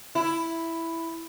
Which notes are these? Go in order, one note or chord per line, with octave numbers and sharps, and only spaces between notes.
E4